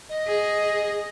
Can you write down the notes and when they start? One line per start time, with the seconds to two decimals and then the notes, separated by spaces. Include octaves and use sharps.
0.09 D#5
0.27 G#4